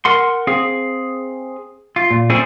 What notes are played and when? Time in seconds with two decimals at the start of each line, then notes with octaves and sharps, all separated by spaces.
0.05 A#4 F#5 C6
0.47 C4 G#4 F5
1.96 F4
2.11 A#2
2.30 C4 C#4 E4 G#4 A4 C5